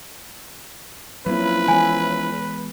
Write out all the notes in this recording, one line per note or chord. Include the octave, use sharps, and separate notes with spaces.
F3 F#3 A#3 C4 C#4 E4 B4
E3 G#3 B3 G#5